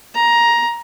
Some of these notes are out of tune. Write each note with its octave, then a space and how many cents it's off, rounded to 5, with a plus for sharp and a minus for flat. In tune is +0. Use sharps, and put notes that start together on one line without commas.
A#5 +15